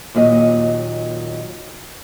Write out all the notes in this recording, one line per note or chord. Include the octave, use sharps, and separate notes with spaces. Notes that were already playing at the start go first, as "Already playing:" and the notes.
D#2 A#2 F#3 D#5